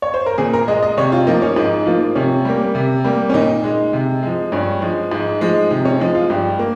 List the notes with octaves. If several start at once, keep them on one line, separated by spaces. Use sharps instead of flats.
C#5
C5
A#4
A#2 G#4
A#4
G#3 D#5
D#5
C3 C#5
F4
F3 A#3 D#4
C#4
G#2 D#4
F3 A#3 F4
C3 C#4
G3 A#3
C3
G3 A#3
C#4
A#2 D#4
G#3
C3
F3 G#3
G2 C#4
F3 G#3
G#2
F3 G#3
C3 D#4
C#4
F3 G#3 D#4
F4
G2 G4
A#3